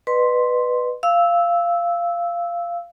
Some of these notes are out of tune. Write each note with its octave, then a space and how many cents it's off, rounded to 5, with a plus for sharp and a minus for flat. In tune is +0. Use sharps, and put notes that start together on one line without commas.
B4 +0 D#5 -40 C6 +0
F5 -15 E6 -10